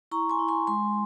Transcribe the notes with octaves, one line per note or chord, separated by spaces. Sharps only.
E4 A#5 C#6
G#5 C6
E4
G#5 C6
G#3 G#5 C6